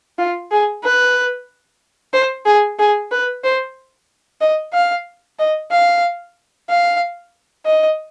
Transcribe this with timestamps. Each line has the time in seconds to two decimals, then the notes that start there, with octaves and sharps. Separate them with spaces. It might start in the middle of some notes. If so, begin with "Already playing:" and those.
0.18 F4
0.51 G#4
0.84 B4
2.13 C5
2.46 G#4
2.79 G#4
3.11 B4
3.44 C5
4.41 D#5
4.73 F5
5.39 D#5
5.71 F5
6.69 F5
7.66 D#5